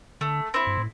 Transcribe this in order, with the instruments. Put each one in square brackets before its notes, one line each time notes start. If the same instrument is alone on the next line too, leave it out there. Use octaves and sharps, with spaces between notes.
[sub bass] D3 [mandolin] A3
[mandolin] C4 E4
[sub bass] G2
A2